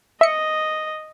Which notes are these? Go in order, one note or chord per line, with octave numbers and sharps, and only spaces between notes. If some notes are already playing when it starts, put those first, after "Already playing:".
D#5 E5 C#7